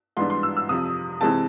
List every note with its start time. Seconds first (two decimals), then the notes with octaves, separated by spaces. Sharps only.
0.17 G#2 E3 G3 B3 D4 C6
0.30 C6
0.43 E6
0.57 E6
0.68 F2 C3 F3 D#6
1.21 C3 E3 G#3 C4 A5